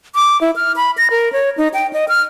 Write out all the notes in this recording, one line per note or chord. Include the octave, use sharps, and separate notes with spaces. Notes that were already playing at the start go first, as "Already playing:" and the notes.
D6
E4
F6
B5
A#6
A#4
C#5
D#4
G5
D#5
F6